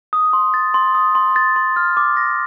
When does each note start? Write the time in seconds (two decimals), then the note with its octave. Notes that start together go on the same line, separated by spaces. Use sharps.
0.13 D#6
0.33 C6
0.54 A6
0.74 C6
0.95 D#6
1.15 C6
1.36 A6
1.56 C6
1.76 F6
1.97 D6
2.17 A#6